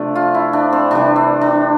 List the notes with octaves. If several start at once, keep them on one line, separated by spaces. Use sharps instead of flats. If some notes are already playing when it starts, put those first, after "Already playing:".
Already playing: C3 F3 A3 D4
F4
E4
D4
C4
C3 E3 G3 D4
C4
D4